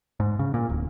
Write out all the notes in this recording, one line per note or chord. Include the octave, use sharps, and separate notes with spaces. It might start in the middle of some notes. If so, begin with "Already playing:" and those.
G#2
C#3
A#2
D1